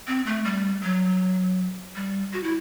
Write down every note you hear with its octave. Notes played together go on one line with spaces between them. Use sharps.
C4
A3
G3
F#3
G3
F#4
E4